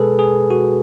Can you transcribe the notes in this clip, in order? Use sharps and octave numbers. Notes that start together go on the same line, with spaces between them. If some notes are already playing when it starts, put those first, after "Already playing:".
Already playing: B2 G#3 G#4 A4 B4
G#4
F#4